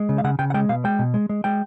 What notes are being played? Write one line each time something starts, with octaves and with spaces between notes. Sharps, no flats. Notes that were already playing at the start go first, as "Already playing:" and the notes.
Already playing: G#3
C#3
F5
C#3 F#5
C#3 G5
F#5
G#3 G5
B2 F5
G#3 G5
B2
G#3
G#3
G#3 G5